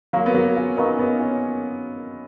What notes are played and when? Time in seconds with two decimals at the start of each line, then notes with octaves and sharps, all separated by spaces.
0.13 F#3 A#3 F#4 A#4 F5 A#5 C#6
0.26 B3
0.34 F#3 A#3
0.56 C#4 F4
0.77 B3 D#4 F#4 A#4 F5 A#5 C#6
0.94 C#4
0.99 B3 D#4
1.19 C#4 F4